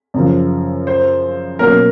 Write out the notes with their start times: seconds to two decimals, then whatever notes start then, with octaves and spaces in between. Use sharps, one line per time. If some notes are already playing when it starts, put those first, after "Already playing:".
0.14 F#2 C#3 F3
0.87 C5
1.59 B2 F#3 A#3 C#4 A#4